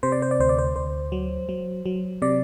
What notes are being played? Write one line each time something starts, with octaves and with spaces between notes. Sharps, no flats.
C3 C5
D5
C5
D5
D2 C5
D5
C5
D2 C5
F#3
F#3
F#3
C3 D5